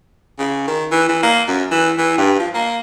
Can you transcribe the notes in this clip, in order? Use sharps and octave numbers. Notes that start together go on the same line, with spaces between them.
C#3
D#3
E3
E3
A#3
F#2
E3
E3
G2
F3
A#3